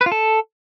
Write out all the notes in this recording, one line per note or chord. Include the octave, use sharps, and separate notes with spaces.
B4
F4
A4